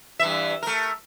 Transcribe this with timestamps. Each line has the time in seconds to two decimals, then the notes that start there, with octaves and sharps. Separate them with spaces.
0.20 G2 E3 E5
0.62 A3 A#4